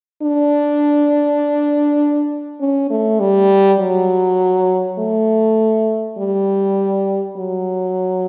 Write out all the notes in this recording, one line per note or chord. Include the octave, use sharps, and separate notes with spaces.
D4
C#4
A3
G3
F#3
A3
G3
F#3